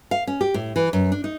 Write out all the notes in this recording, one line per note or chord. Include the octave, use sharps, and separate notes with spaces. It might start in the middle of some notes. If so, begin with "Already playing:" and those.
F5
C#4
G4
A2
E3
F#2
D4
D#4